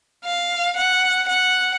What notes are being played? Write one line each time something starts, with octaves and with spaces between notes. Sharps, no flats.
F5
F#5
F#5